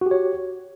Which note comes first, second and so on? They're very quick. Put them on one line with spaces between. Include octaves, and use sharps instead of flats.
F#4 G4 C#5